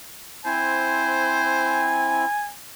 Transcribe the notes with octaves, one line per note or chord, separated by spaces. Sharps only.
C4 E4 C5 G#5